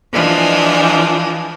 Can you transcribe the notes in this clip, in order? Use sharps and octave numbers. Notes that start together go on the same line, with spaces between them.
E3 F3 G#3 D4